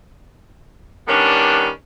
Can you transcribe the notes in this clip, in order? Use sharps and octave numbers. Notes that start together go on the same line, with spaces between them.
D#3 G3 B3 C#4 D4